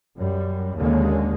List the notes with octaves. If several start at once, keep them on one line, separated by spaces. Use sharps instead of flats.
F#2 G3
D#2 D3 G#3 A#3 C#4